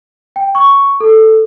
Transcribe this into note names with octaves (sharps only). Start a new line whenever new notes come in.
G5
C#6
A4